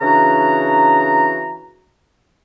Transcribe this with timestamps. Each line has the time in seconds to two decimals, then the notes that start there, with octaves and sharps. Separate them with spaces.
0.01 C#3 E3 D4 F#4 A#5